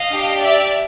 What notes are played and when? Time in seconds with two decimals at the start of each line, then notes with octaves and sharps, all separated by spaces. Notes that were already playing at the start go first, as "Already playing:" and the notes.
Already playing: D#5 F5
0.08 D4 G4
0.38 D5 E5